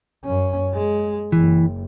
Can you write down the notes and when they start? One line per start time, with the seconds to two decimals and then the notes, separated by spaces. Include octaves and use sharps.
0.25 F#2 C#4
0.74 G#3
1.32 F#1 E3